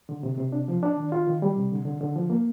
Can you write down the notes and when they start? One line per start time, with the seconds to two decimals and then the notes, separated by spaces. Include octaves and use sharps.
0.09 D3
0.23 C3
0.38 C3
0.52 D4
0.68 F3
0.83 D4
0.97 D#3
1.12 F4
1.27 D#3
1.42 G3
1.56 C3
1.72 D3
1.85 D3
2.01 D3
2.16 F3
2.30 A#3